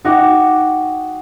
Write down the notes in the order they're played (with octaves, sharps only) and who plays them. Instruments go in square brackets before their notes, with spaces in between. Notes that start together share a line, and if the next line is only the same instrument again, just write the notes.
[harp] D#4 F#4 D#5 F#5 G5 D6